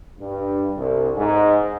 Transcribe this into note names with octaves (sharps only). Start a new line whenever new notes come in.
G2
C2
G#2